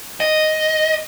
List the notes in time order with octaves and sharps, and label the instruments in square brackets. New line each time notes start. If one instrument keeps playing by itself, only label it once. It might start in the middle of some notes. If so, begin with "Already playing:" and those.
[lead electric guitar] D#5